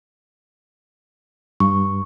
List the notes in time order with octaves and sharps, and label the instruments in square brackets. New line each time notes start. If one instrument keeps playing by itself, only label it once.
[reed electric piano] G2 [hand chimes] C#6